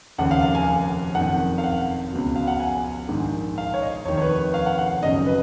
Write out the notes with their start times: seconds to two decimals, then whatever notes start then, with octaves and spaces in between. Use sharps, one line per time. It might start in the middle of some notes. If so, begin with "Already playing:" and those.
0.18 F1 D#2 C#3 F#5
0.31 F5
0.43 F5
0.55 G#5
1.15 F#1 F2 D#3 F#5
1.58 F5
1.64 F#5
2.12 C#2 B2
2.36 F5
2.48 F#5
2.60 G#5
3.08 A#1 G#2 D#3
3.58 F5
3.74 C#5
3.82 D#5
4.05 F1 D#2 D#3 C#5
4.17 C#5
4.22 B4
4.54 F5
4.66 F#5
4.78 F#5
5.02 G#1 F#2 C#3 D#5
5.27 B4